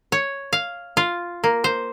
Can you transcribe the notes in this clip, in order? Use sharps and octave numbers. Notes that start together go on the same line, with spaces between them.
C#5
F5
F4
A#3
C5